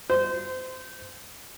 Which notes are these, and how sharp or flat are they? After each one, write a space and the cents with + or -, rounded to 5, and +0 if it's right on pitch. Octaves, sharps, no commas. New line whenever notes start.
C5 -25